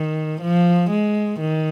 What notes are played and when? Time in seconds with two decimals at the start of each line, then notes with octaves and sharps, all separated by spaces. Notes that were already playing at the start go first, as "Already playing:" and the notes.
Already playing: D#3
0.41 F3
0.90 G#3
1.40 D#3